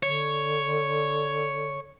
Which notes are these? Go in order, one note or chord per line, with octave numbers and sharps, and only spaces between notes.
D3 C#5